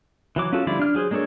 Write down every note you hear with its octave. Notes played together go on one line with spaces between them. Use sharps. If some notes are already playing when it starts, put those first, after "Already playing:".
E3 F#3 D6
C#4 F4 F#4 A4
D3 F3 G3 E4 D5
D4 F6
F#3 G#4 C5
G#3 A#3 D4 A4 C#5